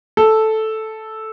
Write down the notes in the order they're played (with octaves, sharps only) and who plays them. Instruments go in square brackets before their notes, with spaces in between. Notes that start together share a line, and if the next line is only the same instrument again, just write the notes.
[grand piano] A4